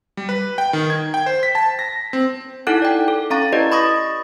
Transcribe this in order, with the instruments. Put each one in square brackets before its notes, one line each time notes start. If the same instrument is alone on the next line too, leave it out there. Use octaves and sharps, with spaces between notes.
[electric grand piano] G3
B4
G5
D#3
G#6
G5
C5
B6
A5
A#6
C4
[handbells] D#4 E4 A4 F#5 F#6
D5 G5
A4
C#4 F5 A#5 C#6 A6
E4 G4 B4 D5 D#5
B5 C#6 D#6 A6 A#6